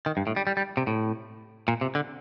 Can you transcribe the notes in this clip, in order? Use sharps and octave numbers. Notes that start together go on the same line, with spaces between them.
D#3
G2
A2
G3
G3
G3
C3
A2
A#2
C3
D3